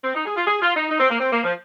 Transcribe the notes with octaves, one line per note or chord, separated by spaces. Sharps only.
C4
D#4
G#4
F4
G#4
F4
D#4
D#4
C4
A#3
C4
A#3
F3